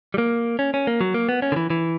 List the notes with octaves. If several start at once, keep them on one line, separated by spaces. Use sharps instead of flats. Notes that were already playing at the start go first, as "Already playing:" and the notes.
G3
A#3
C#4
C#4
A#3
F#3
A#3
B3
C#4
D3
E3
E3